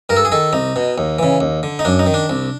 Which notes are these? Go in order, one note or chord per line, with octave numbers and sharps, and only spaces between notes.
G2 A#4
A4
G#4
D#3 A4
C2 D#4
B2
D#2
C#3 E3
D#2
D3
D#4
F#2 D4
D#4
D#3
D4
C2